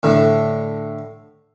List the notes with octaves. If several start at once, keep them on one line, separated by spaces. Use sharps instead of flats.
A2 D3